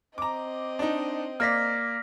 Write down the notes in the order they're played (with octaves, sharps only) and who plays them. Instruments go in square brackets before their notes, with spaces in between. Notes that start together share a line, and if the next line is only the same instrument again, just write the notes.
[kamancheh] C4 D#5 [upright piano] A#5 D6
[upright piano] D4 D#4
[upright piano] A#3 D5 [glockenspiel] F6 A#6 B6